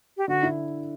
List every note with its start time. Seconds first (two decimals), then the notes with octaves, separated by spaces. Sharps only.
0.17 G4
0.28 D3 F#4
0.43 E4